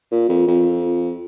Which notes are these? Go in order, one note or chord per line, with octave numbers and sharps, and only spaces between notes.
A#2
F2
F2